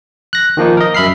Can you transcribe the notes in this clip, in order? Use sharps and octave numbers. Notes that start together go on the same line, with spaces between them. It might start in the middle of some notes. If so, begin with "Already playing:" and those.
F#6 A#6
D#3 F3 A#3 D#4
A#4 D#5
F#2 E5 B5 F6 C7